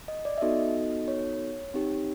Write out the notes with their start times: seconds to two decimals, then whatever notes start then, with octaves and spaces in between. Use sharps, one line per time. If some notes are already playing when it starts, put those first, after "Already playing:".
0.08 D#5
0.25 D5
0.38 E5
0.41 B3 D#4 F#4 A4 D#5
1.08 C#5
1.74 C4 D#4 G4